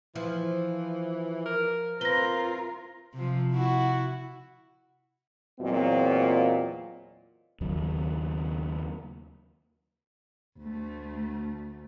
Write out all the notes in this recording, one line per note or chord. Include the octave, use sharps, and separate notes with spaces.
E3 F3
A#4
C4 F4 A#4 B4 A#6 G7
C3 F3
E4 F#4
E2 A#2 F#3 C4 F4 D#5
D#2 C#3 F#3
D2 A3